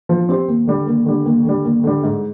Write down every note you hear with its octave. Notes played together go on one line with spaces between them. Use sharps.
F3
C4 G4 C5
D#2
D3 G3
D#2
D3 G3
D#2
D3 G3
D#2
D3 G3
G#2